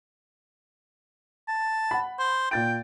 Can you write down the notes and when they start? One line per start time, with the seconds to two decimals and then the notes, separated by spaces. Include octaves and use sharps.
1.49 A5
1.91 F#5 B5
2.19 C5
2.51 A#2 G5 A6 D7